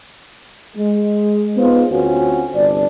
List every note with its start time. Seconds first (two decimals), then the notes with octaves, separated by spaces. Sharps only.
0.77 G#3
1.57 B3 D#4 F4 G#4 B4 C5
1.91 D2 C4 C#4 F4 F#4
2.55 G1 C2 D4 D5